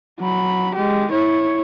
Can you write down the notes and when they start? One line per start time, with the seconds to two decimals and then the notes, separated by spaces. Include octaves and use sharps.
0.20 F#3 B5
0.75 G#3 G4
1.12 E4 C#5